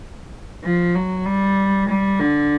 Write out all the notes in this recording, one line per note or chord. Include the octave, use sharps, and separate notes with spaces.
F3
F#3
G3
G3
D3